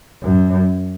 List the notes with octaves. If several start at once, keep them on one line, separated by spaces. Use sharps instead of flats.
F#2